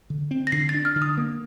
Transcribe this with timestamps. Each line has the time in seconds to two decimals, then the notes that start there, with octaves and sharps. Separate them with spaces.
0.10 D3
0.31 C4
0.47 A#6
0.52 D3 C7
0.69 A6
0.74 D4
0.85 F6
0.96 D3
1.02 D#6
1.17 A#3